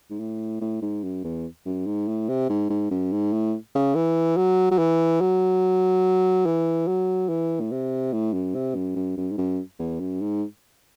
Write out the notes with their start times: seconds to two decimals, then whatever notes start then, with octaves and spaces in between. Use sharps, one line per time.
0.10 G#2
0.20 A2
0.61 A2
0.82 G#2
1.03 F#2
1.24 E2
1.66 F#2
1.86 G#2
2.08 A2
2.29 C3
2.50 G#2
2.70 G#2
2.91 F#2
3.12 G#2
3.33 A2
3.75 C#3
3.95 E3
4.37 F#3
4.71 F#3
4.78 E3
5.21 F#3
6.46 E3
6.87 F#3
7.29 E3
7.60 A2
7.71 C3
8.13 A2
8.33 F#2
8.55 C3
8.75 F#2
8.96 F#2
9.17 F#2
9.31 G#2
9.38 F#2
9.79 E2
10.00 F#2
10.21 G#2